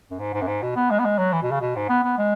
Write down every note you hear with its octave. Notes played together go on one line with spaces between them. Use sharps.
F#2
G#2
G#2
F#2
G#2
B2
B3
G#3
B3
G#3
F#3
E3
B2
C#3
B2
G#2
B3
B3
G#3